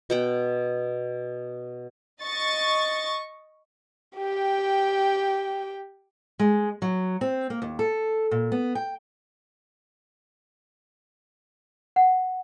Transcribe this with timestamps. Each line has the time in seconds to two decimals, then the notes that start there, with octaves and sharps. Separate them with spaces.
0.10 B2 F#5 G5
2.22 D#5 C#6 A6
4.17 G4 G5
6.39 G#3
6.82 F#3
7.21 C4
7.50 A#3
7.62 D#2
7.79 A4
8.31 A#2
8.52 B3
8.75 G5
11.96 F#5